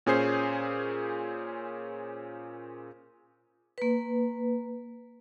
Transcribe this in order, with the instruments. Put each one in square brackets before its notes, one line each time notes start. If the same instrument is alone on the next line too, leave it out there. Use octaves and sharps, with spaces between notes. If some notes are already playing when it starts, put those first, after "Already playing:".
[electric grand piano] A#2 C#4 G#4 C5 C7
[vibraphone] A#3 B4